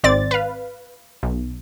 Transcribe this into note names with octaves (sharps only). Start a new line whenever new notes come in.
G#1 C4 D5 A6
B4 F5
B1